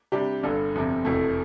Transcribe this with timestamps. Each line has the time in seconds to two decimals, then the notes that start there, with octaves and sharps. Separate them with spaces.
0.12 C3 G3 D4 G4
0.43 G1 G2 D3
0.75 G1 F2 C3
1.05 F1 E2 B2 A3